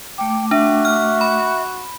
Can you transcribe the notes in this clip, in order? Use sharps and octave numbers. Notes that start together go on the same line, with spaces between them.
A3 G5 D6
D4 F#4 E5
F6
B5